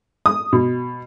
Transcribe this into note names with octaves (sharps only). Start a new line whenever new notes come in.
D#6
B2